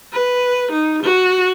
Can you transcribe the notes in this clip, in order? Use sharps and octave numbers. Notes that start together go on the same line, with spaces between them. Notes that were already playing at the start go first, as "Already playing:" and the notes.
B4
D#4
F#4